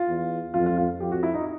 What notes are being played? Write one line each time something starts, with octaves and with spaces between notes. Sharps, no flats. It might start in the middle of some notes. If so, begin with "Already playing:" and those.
Already playing: F4
E2
F2 F4
F4
F4
F2 G4
F#4
E4
D#4